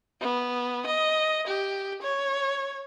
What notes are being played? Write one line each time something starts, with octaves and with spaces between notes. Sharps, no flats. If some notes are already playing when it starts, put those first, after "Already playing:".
B3
D#5
G4
C#5